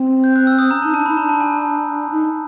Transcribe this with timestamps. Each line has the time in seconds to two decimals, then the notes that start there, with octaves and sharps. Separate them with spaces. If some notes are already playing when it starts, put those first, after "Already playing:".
Already playing: C4
0.24 G6
0.36 F#6
0.47 E6
0.59 D#6
0.71 C#4 A#5
0.82 A5
0.85 D#4
0.94 D4 A5
1.06 D#4 B5
1.17 D4 A#5
1.29 A5
1.40 G#5
2.11 D#4